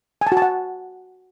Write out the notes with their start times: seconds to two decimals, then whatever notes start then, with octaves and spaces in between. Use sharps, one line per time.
0.21 G#5
0.27 A5
0.32 F#4
0.37 A5
0.42 F#5